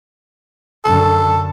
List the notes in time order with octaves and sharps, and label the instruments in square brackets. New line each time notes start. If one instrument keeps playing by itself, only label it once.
[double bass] F#2 D3 [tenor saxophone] A4